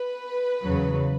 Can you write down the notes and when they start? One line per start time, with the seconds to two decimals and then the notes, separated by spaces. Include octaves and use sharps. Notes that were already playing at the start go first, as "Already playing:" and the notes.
Already playing: B4
0.63 E2 C#3 F#3